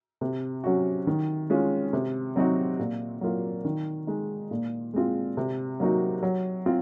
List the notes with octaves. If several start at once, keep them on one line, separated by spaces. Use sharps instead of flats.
C3
F#3 C#4 F#4
D#3
G#3 C#4 F4
C3
F#3 C4 D#4 F#4
A#2
F#3 A#3 F4
D#3
G#3 D#4
A#2
G#3 C4 F4
C3
F#3 A#3 D#4 F#4
F#3
C4 F4